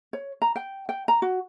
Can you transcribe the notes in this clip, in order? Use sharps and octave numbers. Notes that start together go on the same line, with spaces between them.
C#5
A#5
G5
G5
A#5
F#4